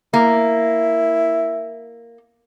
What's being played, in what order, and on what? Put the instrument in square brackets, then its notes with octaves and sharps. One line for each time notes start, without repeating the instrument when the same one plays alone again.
[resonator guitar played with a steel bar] A#3 [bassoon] E4